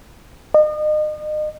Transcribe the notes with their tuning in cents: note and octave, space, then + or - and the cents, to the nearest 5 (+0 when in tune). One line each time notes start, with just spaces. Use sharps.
D#5 -40